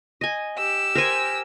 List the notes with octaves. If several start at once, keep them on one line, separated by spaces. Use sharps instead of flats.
D#5 G#5
G4 E6
A#4 C5 G#5